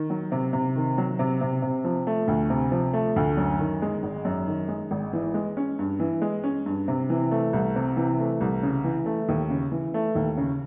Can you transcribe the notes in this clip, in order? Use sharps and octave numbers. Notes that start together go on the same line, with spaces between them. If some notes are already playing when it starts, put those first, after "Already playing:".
Already playing: D#3
F#3
C3
C3
D#3
F#3
C3
C3
C3
F3
A3
D2
C3
F3
A3
D2
F#2
D#3
G#3
G#1
F#2
D#3
G#3
G#1
E3
G#3
C#4
G2
E3
G#3
C#4
G2
C3
E3
A3
C2
C3
E3
A3
C2
C#3
E3
A3
D#2
C#3
E3
A3
D#2
C#3